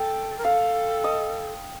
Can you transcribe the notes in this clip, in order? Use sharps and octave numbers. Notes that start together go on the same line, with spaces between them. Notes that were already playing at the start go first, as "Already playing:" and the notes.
Already playing: A4 G5 A5
A#4
A4 F5
D#5